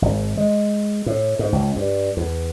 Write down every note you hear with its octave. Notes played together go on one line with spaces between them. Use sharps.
G#1
G#3
A2
G#2
C#2
G2
E2